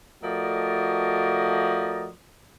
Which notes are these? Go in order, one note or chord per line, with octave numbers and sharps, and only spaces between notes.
F3 A3 F#4 A#4 D5 D#5